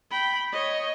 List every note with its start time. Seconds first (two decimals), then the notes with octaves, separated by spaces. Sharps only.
0.11 G5 B5
0.53 C#5 D#5